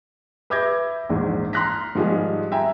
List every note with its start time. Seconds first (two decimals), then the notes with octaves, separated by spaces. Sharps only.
0.50 B4 E5 D6 G6 G#6 A#6
1.09 A#1 E2 G#2
1.53 A#5 C6 F6 F#6 A#6 B6
1.95 G#2 D#3 F3 G3 G#3
2.52 E5 G5 G#5 A#5